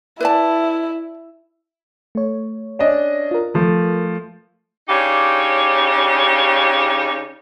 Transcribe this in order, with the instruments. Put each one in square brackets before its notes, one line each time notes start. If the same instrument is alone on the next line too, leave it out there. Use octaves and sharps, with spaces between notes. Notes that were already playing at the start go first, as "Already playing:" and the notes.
[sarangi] E4 [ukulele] B4 D5 A5
[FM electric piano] A3 C#5
[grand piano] C#4 D4 D#5
[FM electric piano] F4 A#4
[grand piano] F3 A3
[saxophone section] C#3 D4 D#4 G4 C#5